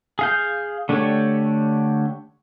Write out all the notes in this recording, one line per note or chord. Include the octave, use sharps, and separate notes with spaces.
G#4 F5 G6
D3 A3 D4 G4 C#5